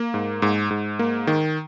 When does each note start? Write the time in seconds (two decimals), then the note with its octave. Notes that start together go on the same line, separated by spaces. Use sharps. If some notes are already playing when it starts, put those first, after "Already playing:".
Already playing: A#3
0.14 G#2
0.42 G#2
0.71 G#2
0.99 A#3
1.27 D#3